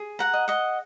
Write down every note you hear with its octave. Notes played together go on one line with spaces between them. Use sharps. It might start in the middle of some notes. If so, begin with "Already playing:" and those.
Already playing: G#4
F#5 A#5
D#5
D#5 F#5